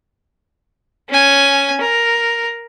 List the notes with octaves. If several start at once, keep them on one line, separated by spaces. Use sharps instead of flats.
C#4 G#5
A#4